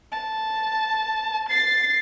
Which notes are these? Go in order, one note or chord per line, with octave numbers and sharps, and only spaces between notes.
A5
A6 C7